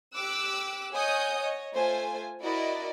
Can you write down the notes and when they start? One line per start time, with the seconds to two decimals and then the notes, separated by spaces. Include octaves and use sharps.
0.14 G4 D6 E6 F#6
0.93 C#5 D#5 F#5 G#5 D#6 G6
1.40 C#5 D#5
1.74 A3 F4 C5 G#5
2.42 E4 F#4 A#4 D5 D#5